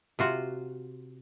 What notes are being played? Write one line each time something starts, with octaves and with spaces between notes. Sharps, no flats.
C3 F4 F#4